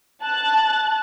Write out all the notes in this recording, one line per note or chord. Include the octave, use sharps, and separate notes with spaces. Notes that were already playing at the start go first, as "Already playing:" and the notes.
A5 F#6 A6